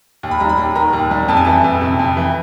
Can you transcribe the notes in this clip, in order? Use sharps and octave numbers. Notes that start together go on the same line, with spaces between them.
D#2
B5
G3 A#5
B5
D#2
D#3 A#5
D#2
G3
F2 A5
G#5
E3 A5
F2
C3
F2
E3